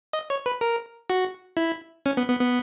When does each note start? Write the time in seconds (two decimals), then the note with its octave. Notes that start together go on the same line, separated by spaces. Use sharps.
0.13 D#5
0.30 C#5
0.46 B4
0.61 A#4
1.10 F#4
1.57 E4
2.06 C#4
2.17 B3
2.29 B3
2.40 B3